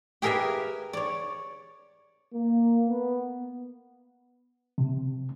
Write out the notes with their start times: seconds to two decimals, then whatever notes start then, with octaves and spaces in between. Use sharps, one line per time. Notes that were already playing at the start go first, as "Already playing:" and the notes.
0.22 G4 G#4 A#4 B4 E5 G#5
0.93 C#5 D5
2.34 A#3
2.89 B3
4.78 C3